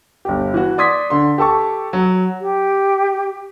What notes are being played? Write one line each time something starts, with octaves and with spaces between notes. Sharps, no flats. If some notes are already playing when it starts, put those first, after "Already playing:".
G1 G4
E3 F#4
D5 C6 D#6 G#6 B6
D3 C6
G4 A4 A5 C#6
F#3
G4